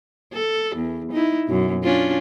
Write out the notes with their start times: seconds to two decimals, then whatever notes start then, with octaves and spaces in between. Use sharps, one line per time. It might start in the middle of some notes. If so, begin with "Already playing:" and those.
0.33 A4
0.76 E2
1.12 D#4 E4
1.47 F#2 B2
1.84 C#4 D4 F4